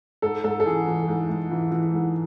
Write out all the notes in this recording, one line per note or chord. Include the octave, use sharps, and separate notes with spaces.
G#2 A4
G#2 A4
A4
E3 G#4
E3
G#2
G#2
E3
E3
G#2